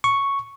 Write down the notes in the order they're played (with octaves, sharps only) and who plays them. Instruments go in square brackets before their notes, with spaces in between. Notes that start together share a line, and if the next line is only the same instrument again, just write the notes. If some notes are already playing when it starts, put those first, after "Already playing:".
[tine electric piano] C#6